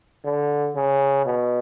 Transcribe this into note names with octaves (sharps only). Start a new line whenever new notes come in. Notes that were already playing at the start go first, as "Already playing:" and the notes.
D3
C#3
B2